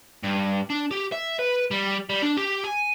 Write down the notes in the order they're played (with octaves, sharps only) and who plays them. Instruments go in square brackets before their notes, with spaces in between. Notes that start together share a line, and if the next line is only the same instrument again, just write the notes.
[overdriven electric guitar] G2
D4
G4
E5
B4
G3
G3
D4
G4
G#5